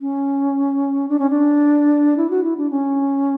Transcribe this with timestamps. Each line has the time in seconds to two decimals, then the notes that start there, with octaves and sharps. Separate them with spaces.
0.01 C#4
1.09 D4
1.19 C#4
1.30 D4
2.17 E4
2.30 F#4
2.44 E4
2.57 D4
2.70 C#4